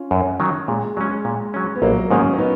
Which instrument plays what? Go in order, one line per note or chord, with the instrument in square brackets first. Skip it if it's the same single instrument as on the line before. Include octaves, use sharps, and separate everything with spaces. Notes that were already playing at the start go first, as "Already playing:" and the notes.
Already playing: [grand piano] C#4 F4
[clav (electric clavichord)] F#2
D#3 F#3
[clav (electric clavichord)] A#2 [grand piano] G#3
[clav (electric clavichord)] F#3 C#4 [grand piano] G#3
[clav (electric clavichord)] A#2
F#3 C#4
[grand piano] B3
[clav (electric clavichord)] A#1 [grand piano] F#3 A#3
[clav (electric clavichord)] G#2 D#3 G#3 [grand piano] A#3 C#4
[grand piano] C#4
B3 D#4